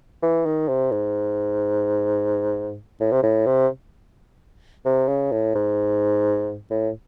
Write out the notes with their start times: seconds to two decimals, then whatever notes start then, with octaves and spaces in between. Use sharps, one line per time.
0.23 E3
0.46 D#3
0.69 C3
0.92 G#2
3.00 A2
3.12 C3
3.23 A2
3.46 C3
4.85 C3
5.08 C#3
5.32 A2
5.55 G#2
6.70 A2